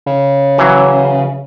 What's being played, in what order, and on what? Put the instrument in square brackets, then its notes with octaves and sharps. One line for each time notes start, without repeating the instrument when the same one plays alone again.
[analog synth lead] C#3
[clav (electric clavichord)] E3 F#3